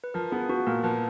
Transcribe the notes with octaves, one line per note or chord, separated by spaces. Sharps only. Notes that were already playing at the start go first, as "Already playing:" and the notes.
B4
F3 A#4
B3 G#4
B3 F#4
A#2 A#4
F3 B4